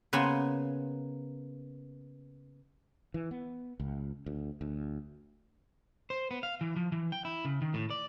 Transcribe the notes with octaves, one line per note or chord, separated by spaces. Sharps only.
C#3 A#3 B3 C5 G#5
E3
B3
C#2
D2
D2
C5
B3
F5
E3
F3
E3
G5
E4
C#3
D#3
A2
D5